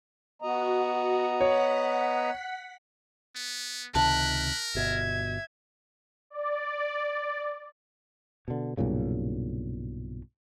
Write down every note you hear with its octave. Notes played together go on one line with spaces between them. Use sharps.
B3 F#4 D#5 A#5
C#5 F#5 B6
B3
C#2 C3 D#3 A#4 A5 F#6 B6
G1 B2 E5 G#6
D5
B2 D3
B1 G2 A#2 C#3